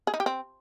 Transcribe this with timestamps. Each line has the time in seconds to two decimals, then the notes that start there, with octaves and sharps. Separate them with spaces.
0.07 G#4
0.14 D#4
0.20 G4
0.26 C4